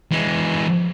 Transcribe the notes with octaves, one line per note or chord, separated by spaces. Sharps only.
E3 G#3